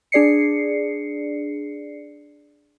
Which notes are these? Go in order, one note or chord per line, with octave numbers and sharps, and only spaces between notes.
D4 G#4 D5 C7 C#7